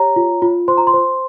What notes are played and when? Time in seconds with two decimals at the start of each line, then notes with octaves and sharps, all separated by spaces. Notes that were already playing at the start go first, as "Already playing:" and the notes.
Already playing: G4 C#5 A#5
0.16 F4
0.42 F4
0.68 C5 C6
0.78 A#5
0.87 C6
0.94 C5